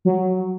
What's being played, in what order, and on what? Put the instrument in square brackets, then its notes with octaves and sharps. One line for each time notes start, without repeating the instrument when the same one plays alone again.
[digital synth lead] F#3